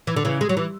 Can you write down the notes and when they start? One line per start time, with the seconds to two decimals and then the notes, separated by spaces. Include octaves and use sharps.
0.07 E3
0.16 D3
0.25 C#3 E3
0.41 G#3
0.49 F#3
0.57 E3